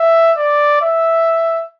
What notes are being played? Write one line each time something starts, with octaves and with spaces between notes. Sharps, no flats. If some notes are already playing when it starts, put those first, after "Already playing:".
Already playing: E5
D5
E5